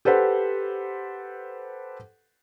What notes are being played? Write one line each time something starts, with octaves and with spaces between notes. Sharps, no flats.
G4 A4 B4 C5 F#5